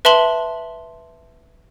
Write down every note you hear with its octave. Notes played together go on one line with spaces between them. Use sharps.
B4 E5 A5 C6 F#7 G7